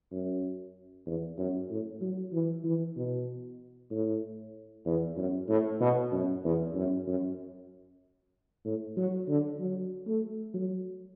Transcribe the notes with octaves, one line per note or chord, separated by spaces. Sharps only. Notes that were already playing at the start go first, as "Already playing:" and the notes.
F#2
E2
F#2
A2
F#3
E3
E3
B2
A2
E2
F#2
A2
B2
F#2
E2
F#2
F#2
A2
F#3
D3
F#3
A3
F#3